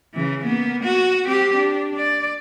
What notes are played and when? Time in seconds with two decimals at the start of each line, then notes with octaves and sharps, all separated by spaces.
0.14 C#3 E3
0.45 A#3 B3
0.83 F#4
1.25 C4 G4
1.56 D4
1.98 D5